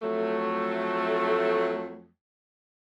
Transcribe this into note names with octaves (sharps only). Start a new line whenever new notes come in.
F2 F#3 A3